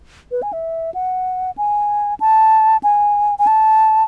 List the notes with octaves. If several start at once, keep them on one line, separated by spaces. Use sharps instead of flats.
B4
G#5
E5
F#5
G#5
A5
G#5
G#5
A5